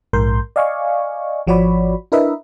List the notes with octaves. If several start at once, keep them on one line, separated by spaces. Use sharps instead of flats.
A#1 G#2 A#4 C6 G6
D5 D#5 F5 G#5 C#6
G#1 F3 F#4 C#5 D5 B5
D4 E4 A#4 B4 D#5 E5